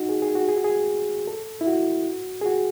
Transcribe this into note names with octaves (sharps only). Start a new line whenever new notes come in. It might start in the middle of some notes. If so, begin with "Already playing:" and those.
Already playing: D#4 F#4
G#4
G#4
F#4
G#4
F#4
G#4
A4
E4
F#4
G#4
F#4